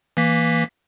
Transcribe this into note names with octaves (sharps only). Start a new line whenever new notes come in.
E3 A#3 B6